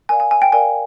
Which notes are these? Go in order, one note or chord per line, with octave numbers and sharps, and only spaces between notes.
A#4 D5 F5 G#5
G#5
G#5
G5
A#4 D5 F5 G#5